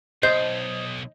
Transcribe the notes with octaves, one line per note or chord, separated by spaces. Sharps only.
B1 C5 D#5 G6